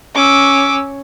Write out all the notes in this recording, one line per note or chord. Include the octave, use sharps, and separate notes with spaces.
C#4 D6 E6